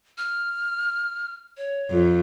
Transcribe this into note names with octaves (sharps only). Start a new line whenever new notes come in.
F6
C#5
F2